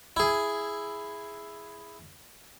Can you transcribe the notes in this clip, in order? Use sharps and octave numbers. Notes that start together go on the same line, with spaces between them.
E4 G#4